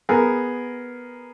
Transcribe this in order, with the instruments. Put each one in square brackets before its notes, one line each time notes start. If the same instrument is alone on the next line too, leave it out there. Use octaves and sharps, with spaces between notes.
[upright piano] B3 G#4 A#4